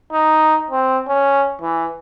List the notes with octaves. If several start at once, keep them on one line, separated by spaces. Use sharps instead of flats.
D#4
C4
C#4
E3